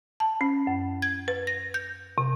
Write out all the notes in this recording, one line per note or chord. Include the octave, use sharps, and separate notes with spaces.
A5
C#4
F#2
G#6
B4
A#6
G6
C3